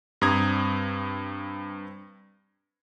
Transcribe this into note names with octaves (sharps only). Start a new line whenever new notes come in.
G2 C4 A#5 D#6 G#6